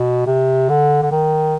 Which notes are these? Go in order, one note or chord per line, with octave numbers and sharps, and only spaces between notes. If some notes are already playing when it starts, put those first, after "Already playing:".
Already playing: B2
C3
D3
D3
D#3